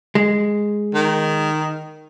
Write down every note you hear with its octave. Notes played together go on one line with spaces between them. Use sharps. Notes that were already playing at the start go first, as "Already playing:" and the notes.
G#3
D#3